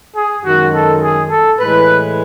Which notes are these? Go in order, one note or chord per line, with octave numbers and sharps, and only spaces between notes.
G#4
F#2 D#3 G#3 F#4
A4
G#4
A4
A2 E3 G#3 B4